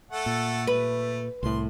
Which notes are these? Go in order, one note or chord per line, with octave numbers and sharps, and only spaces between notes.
A3 A4 F#5
A#2
A3 B4
C2 A2 C6